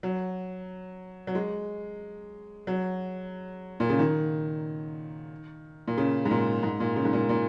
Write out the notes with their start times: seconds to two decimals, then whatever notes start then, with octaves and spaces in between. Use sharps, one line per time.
0.03 F#3
1.27 F#3
1.35 G#3
2.67 F#3
3.80 A#2
3.90 C#3
3.99 D#3
5.88 A#2
5.98 C#3
6.25 G#2
6.31 A#2
6.63 G#2
6.80 A#2
6.96 C#3
7.05 G#2
7.13 A#2
7.29 A#2